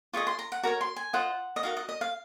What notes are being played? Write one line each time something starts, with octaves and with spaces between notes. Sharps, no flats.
F4 G#4 D#5 C#6
C6
A#5
F#5
F#4 A#4 C#5 A#5
C6
G#5
F4 C5 D#5 F#5
D#5
D#4 F#4 A#4 F5
D#5
D#5
F5